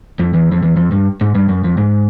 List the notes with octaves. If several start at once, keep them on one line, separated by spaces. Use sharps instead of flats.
F2
E2
F2
E2
F2
G2
G#2
G2
F#2
F2
G#2